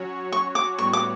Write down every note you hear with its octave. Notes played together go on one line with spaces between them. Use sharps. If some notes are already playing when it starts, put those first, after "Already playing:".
Already playing: F#3 C#4 F#4 C#5
C#6
D6
A2 G3 B3 F#4 C#5 C#6
D6